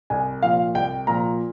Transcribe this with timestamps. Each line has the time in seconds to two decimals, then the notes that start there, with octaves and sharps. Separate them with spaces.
0.10 C2 G#5
0.43 A#2 F3 F5
0.75 C2 G5
1.07 A#2 F3 A#5